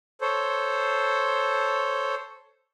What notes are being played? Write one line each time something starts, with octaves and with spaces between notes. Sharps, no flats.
A4 C5 C#5